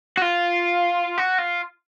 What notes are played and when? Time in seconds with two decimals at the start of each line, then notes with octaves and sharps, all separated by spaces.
0.17 F#4
0.22 F4
1.18 F#4
1.38 F4